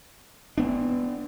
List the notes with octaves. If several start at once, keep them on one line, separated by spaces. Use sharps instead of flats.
B3 D4